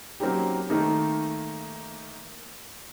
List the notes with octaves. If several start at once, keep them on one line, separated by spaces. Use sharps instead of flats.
F#3 A#3 C4 C#4 D#4 G4
D#3 A3 A#3 D#4